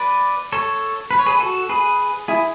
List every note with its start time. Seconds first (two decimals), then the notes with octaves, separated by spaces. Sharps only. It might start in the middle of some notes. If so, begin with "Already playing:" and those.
Already playing: B4 D5
0.52 A4 C#5
1.11 B4
1.19 C#5
1.26 G#4 B4
1.40 F#4 A4
1.69 G#4 B4
2.28 E4 G#4